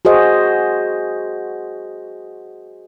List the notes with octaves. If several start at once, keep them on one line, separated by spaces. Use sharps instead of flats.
F#4 G#4 C5 D#5